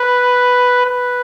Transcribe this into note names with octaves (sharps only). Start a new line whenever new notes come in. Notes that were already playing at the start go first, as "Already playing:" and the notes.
Already playing: B4
B4